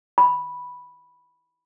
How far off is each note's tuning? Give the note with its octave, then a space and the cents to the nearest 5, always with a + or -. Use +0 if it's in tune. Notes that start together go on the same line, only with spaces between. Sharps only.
B5 -5